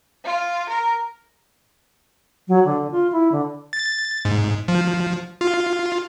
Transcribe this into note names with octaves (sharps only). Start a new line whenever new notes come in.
F4
A#4
F#3
D3
F4
E4
D3
A6
G#2
F3
F4